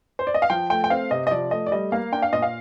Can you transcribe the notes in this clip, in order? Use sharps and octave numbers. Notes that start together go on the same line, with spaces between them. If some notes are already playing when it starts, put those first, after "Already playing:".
C5
D5
D#5
F5
F3 G5
A3 G5
G5
C4 F5
C3 D#5
D#5
F3 D5
A3 D#5
D5
G3 D#5
A#3 F5
D4 G5
F5
A#2 D#5
F5